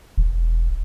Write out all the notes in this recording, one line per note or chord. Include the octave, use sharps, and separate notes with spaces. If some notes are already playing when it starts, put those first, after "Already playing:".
E1